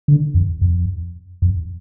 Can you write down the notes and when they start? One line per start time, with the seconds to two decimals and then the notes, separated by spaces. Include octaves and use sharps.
0.08 D3
0.35 F2
0.61 F2
1.42 F2